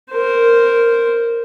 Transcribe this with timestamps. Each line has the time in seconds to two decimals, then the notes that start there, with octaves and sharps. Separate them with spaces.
0.12 A#4 C5